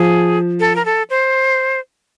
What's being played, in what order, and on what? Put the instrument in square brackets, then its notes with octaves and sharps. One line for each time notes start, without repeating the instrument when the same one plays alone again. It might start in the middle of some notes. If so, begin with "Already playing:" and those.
Already playing: [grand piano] F3 [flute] G#4
[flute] A4
A#4
A4
C5